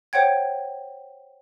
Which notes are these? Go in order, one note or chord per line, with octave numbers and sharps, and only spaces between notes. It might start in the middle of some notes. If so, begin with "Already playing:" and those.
C5 C#5 F#5 G5 G#6